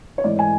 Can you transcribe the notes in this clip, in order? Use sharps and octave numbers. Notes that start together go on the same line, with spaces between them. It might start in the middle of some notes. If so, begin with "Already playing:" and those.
C#5
G#2 E3 A3 D5
G#5